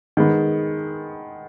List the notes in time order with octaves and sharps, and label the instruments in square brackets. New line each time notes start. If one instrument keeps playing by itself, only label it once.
[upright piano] D#3 G#3 B3